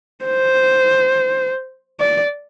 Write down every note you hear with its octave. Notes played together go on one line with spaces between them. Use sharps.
C5
D5